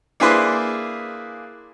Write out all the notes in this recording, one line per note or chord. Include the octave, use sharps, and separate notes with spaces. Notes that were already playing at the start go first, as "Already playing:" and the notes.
A#3 D4 E4 G#4 B4 C5